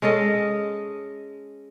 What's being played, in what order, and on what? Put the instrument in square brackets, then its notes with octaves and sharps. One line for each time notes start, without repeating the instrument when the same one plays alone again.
[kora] G#3 C#4 A4 D#5